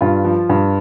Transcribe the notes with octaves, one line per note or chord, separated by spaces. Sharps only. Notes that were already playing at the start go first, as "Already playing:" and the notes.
G2 F4
F3
G2